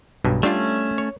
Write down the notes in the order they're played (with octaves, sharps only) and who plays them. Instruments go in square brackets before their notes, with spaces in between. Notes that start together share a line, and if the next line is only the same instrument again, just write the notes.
[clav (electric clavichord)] B1 G2 B2
[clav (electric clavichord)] G3 D4 F4 [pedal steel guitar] A3 C#4
[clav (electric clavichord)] C#5